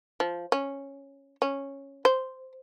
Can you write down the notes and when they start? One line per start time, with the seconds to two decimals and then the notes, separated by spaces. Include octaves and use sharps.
0.20 F3
0.52 C#4
1.42 C#4
2.05 C5